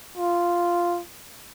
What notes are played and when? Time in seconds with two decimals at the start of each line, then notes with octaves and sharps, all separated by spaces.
0.17 F4